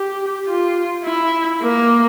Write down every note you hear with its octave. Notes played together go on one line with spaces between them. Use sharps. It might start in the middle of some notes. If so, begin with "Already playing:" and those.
Already playing: G4
F4
E4
A#3